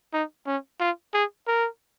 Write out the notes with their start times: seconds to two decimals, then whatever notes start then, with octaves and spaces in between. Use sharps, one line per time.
0.13 D#4
0.46 C#4
0.80 F4
1.14 G#4
1.47 A#4